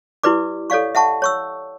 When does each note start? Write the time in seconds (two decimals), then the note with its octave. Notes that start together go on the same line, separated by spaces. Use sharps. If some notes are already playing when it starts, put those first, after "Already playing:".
0.24 E4 G4 B4 D5 D6
0.70 A4 C#5 D5 F5 C#6
0.95 E5 F#5 A5 C#6
1.22 C#5 C#6 E6